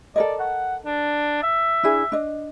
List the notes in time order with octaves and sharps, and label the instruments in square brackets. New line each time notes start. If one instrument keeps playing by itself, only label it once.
[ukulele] A4 A#4 D#5 [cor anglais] D5
[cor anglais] F#5
D4
E5
[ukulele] D4 E4 G#4
D4 D#5